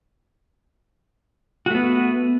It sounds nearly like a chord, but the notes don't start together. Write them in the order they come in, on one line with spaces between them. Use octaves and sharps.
F#4 A3 B3